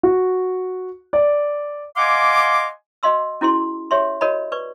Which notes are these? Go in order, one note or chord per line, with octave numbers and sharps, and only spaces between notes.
F#4
D5
D#5 F5 F#5 G#5 C6 D6
F#4 D#5 F5 C6 E6
C#4 E4 F#4 G#4 C6
G4 C#5 E5 C6
F#4 A#4 C#5 D#5 B5
B4 D5 C#6